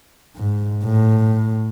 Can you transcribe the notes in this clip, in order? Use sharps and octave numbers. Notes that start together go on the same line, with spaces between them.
G#2
A2